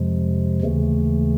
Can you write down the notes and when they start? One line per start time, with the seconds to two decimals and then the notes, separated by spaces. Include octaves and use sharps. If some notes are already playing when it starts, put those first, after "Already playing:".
Already playing: F2 C3 F3 G#3
0.62 D#2 C#3 E3 A3